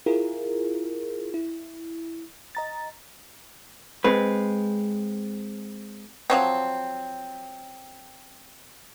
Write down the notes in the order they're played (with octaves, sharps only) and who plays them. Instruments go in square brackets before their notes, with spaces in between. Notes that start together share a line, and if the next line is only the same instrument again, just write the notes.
[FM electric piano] E4 F4 G#4 A#4
E4
D#5 A#5 A6
[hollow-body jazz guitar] G#3 C4 B4
[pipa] F3 F#3 C4